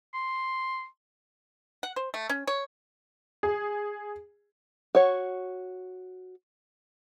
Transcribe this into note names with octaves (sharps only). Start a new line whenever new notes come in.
C6
F#5
C5
A3
C#4
C#5
G#4
F#4 C#5